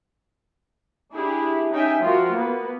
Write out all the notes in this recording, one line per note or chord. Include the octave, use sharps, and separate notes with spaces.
D4 E4 G4 G#4
C#4 D#4 E5 G5 G#5
F3 G3 F4 F#4 A#4
A#3 B3